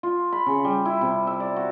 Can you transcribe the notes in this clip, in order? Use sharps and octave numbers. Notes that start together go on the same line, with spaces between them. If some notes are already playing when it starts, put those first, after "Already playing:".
F4
B5
C#3
G3
E4
C3
E5
D5
F#4